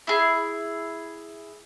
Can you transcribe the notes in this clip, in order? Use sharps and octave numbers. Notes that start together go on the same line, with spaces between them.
E4 G#4